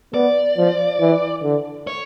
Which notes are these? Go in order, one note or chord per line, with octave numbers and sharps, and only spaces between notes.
B3 D5
F3
E3
D3
C#5